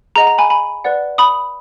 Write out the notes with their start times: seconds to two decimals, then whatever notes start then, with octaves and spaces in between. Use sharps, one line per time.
0.16 G#4 D#5 F#5 A#5
0.27 A#5
0.38 G#5 B5
0.50 G#5 B5
0.84 B4 D5 F#5
1.18 B5 D#6